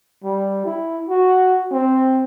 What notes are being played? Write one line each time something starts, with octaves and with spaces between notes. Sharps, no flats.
G3
E4
F#4
C4